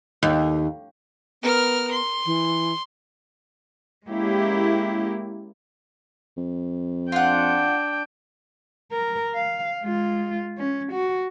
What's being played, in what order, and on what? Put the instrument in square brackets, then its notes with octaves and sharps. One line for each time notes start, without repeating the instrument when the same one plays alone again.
[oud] D#2
[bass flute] B3 [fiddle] A#4 F6
[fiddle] C6
[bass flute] E3
[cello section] G#3 A#3 C#4 E4 G4
[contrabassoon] F2
[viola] D4 G5 [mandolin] F4 F#5
[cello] A#4
F5
G#3 F4
C#4
F#4